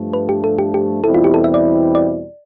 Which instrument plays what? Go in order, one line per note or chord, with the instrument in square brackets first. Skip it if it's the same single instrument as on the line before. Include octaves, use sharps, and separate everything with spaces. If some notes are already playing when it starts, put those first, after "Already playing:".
Already playing: [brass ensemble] G2 F3 A3
[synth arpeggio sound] B4
G4
A4
G4
G4
[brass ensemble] E2 B2 G3 C4 E4 [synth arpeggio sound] A4
[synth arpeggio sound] F4
G4
A4
E5
D5
D5